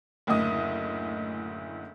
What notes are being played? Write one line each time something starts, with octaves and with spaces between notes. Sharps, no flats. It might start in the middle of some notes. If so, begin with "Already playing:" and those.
F#1 D2 A2 D#5 D#6